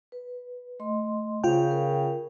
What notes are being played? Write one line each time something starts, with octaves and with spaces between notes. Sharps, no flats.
B4
A3 D#5 C6
C#3 F4 C5 G5
A#4